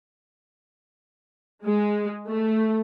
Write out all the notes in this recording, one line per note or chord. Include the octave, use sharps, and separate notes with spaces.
G#3
A3